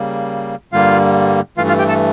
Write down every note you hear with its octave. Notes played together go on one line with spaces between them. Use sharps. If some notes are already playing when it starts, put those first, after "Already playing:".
Already playing: C#3 G3 A#3
G2 D3 G3 A#3 F4 F5
G2 E3 A3 F4 F5
F4 F5
G4 G5
A4 A5